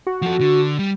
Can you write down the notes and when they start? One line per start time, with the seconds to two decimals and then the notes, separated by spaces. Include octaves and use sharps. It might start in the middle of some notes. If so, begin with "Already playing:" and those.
0.07 F#4
0.22 F3 A4
0.40 D3
0.79 G3